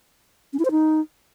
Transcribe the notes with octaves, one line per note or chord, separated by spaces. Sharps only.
C#4
E4
C5
D#4